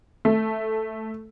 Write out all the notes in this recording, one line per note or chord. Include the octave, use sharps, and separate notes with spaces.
A3